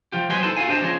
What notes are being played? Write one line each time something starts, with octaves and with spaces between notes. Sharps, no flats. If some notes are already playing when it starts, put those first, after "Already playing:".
F3 F4 G4
F#3 B4 C5 D#5 G#5 C6
D#4 E4 A4 C5 A5
F4 F#4 A4 F5 G#5
D4 G4 C5 D#5 A5
F3 C#4 F4 G#4 D#5